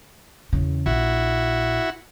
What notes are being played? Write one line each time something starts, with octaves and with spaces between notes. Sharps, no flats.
E2 C#3
A#1 E4 F#4